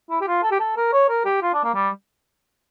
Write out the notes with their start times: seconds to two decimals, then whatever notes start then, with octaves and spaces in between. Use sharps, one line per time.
0.10 E4
0.21 G4
0.27 F4
0.43 A4
0.51 G4
0.60 A4
0.77 A#4
0.93 C#5
1.09 A#4
1.25 G4
1.42 F4
1.53 D4
1.64 A#3
1.74 G3